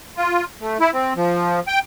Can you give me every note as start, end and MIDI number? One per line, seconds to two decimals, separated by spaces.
0.17 0.44 65
0.61 0.78 57
0.80 0.91 64
0.93 1.13 60
1.16 1.60 53
1.68 1.80 79